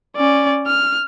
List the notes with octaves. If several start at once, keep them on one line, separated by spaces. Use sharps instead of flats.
C#4 D5
F6